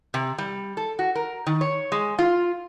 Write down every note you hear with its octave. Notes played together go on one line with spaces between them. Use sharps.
C3
G3
A4
F#4
A#4
D#3
C#5
G#3
F4